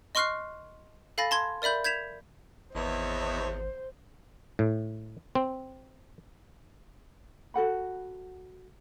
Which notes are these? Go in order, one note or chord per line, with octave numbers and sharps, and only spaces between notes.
D#5 C6 C#6 F6 F#6 C7
A4 F5 G#5 B5 A6 A#6
A5 C6 G#6
A#4 D5 E5 B5 G6
G6 G#6 B6 E7 F7
G#1 E2 C5 C#5 D#5 E5
A2
C4
F#4 A4 F#5 B5